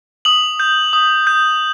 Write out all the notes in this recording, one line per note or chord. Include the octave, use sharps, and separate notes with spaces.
D#6 F#7
G6
D#6
G6